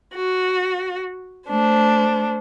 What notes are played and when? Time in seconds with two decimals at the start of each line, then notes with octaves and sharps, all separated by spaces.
0.15 F#4
1.49 A3 D4 C5